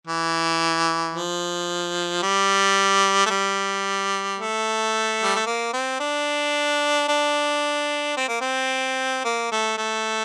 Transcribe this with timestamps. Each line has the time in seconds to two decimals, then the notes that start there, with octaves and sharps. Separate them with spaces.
0.07 E3
1.14 F3
2.23 G3
3.26 A3
3.30 G3
4.38 A3
5.23 G3
5.35 A3
5.46 A#3
5.73 C4
6.00 D4
7.08 D4
8.17 C4
8.28 A#3
8.41 C4
9.24 A#3
9.52 A3
9.77 A3